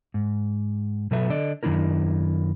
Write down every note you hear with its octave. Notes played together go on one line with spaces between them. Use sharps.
G#2
B2 F#3 A4 B4 E5
D3 A4 D5 D#5
F#2 D#3 G3 D4 E4 A#4